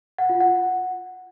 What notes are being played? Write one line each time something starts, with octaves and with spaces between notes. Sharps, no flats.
F#5
F4
F#5